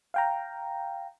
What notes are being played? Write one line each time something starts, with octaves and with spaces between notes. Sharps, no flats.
F5 G5 A#5